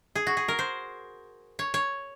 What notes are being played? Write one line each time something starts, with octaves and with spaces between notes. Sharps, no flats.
G#4
F#4
G#4
A#4
C5
C#5
C#5